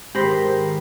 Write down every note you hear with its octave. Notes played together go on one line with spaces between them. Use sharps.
G#2 D#3 G4 C5 B5 A#6 B6